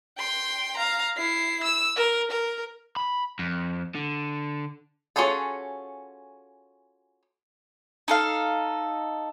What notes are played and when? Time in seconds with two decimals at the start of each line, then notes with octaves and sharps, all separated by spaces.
0.18 G5 C6
0.77 F5 A#5
1.17 E4 C7
1.63 E6
1.96 A#4
2.31 A#4
2.96 B5
3.39 F2
3.95 D3
5.16 C#4 F4 F#4 G#4 A4
8.08 D#4 A4 F5